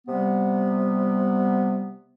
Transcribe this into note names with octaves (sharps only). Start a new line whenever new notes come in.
C3 G3 B3